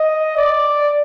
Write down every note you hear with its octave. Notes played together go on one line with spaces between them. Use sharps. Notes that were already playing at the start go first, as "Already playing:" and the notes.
Already playing: D#5
D5